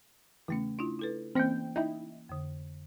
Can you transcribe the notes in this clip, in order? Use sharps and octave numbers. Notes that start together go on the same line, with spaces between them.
E2 C#3 A3 C#4
D4 E4 F4
E4 A4 B4
E3 A#3 C4 C#4 G5
D#4 E4 G5 G6
F2 D3